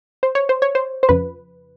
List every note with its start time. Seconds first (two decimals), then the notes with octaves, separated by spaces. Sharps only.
0.23 C5
0.35 C#5
0.49 C5
0.62 C#5
0.75 C5
1.03 C5
1.09 F2 C#3 F3 B4